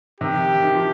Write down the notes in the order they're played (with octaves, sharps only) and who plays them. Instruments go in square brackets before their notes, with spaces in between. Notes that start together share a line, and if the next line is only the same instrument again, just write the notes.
[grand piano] C3 D#3 [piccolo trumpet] G4
[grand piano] D#3
F3